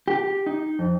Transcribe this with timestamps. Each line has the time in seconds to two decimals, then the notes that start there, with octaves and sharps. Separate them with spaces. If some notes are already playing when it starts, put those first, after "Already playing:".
0.08 G4
0.46 D#4
0.79 F2